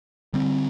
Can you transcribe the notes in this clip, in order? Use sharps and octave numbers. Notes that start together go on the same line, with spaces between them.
D3 G3 C4